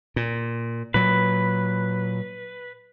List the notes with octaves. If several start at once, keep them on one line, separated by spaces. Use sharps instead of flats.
A#2
A#2 F#3 B4